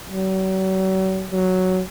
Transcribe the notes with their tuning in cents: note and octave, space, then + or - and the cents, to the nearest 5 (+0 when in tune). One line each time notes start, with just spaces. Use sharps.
F#3 +40
F#3 +5